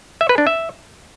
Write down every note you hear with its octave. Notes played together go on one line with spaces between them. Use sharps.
E5
B4
D4
E5